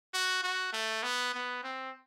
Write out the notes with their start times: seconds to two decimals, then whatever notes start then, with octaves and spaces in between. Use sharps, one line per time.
0.14 F#4
0.43 F#4
0.73 A3
1.03 B3
1.34 B3
1.64 C4